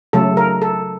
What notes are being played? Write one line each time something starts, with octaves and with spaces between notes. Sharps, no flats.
C#3 F#3 A3 A4
A#4
A4